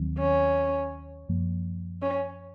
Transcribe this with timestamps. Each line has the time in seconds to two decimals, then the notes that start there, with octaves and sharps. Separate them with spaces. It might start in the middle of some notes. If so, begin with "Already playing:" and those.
Already playing: D#2 D#3 F#3 C4
0.19 C#4
1.29 F#2 F3 A#3
2.02 C#4